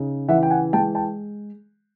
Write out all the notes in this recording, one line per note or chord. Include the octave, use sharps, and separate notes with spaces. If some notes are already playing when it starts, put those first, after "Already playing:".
Already playing: C#3 D#4
E3 E5 F#5
G5
F#5 G#5
G#3 G5 A5
G5 A5